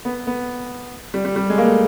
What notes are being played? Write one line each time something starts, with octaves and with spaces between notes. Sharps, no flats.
B3
B3
G3
G3
G3
G#3
A#3
A3